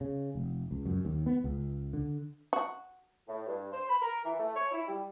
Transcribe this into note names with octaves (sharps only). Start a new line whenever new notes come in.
C#3
F1
C#2
F#2
D#2
B3
C#2
D3
F#4
A2
G2
C5
B5
A#4
E3
A3
C#5
E4
G3